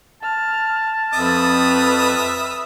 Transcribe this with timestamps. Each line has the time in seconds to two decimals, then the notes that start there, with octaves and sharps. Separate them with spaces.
0.23 A5 F6
1.13 F2 B4 E5 D#6 F6